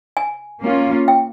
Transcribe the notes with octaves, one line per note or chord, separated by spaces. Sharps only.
G#5
A#3 C#4 F4
G5